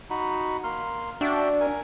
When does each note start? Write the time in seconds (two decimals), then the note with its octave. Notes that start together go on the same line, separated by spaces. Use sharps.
0.10 D#4 F#4 B5
0.64 A#3 C6 F6
1.21 D4 F#4 E5 G5
1.61 A#4 G#5